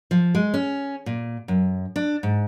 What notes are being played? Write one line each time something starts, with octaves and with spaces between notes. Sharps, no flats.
F3
G#3
C#4
A#2
F#2
D4
G#2